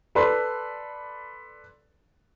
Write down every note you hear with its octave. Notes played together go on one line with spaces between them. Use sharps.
A4 B4 D5 B5 C6